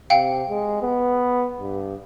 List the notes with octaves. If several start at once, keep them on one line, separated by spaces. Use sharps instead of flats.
C3 F5 G5 C#7
G#3
B3
G2